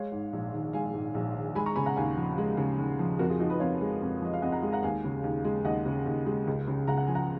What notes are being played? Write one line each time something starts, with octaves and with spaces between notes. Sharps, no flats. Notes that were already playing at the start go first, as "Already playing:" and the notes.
Already playing: G#3 C#5 F5
G#2
A#1
D#3
G#3 F5 G#5
G#2
A#1
D#3
G#3 G#5 B5
A#5 C#6
C#3 G#5 B5
F#5 A#5
D#2 F5 G#5
F3
G#3
C#3
D#2
F3
F2 F#4 A#4
F4 G#4
F3 D#4 F#4
B4 D#5
F2 C#5 F5
G#3
F2
F3 D#5
F5
F2 D#5 F#5
F#5 A#5
G#3
F#5 A#5
D#2 F5 G#5
C#3
D#2
G#3
D#2 D#5 F#5
C#3
D#2
G#3
C#2
C#3
C#2 F#5 A#5
F#5
F3 G#5
F#5 A#5